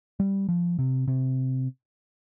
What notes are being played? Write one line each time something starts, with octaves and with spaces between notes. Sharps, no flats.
G3
F3
C3
C3